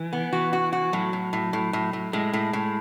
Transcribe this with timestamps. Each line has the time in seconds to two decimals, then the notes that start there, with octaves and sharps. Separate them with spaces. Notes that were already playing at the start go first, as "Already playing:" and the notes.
Already playing: E3
0.13 B3
0.33 E3 F#4
0.53 F#4
0.73 F#4
0.93 A2 F#3
1.13 A2
1.33 A2
1.53 A2
1.73 A2
1.93 A2
2.13 A2 G#3
2.33 A2
2.53 A2